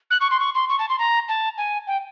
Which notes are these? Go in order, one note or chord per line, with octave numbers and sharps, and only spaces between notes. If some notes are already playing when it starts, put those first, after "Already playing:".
F#6
C#6
C6
C#6
C6
C#6
A5
C6
A#5
A5
G#5
G5